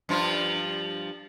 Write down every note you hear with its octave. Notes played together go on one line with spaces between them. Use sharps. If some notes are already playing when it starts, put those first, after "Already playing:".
G2 F3 F4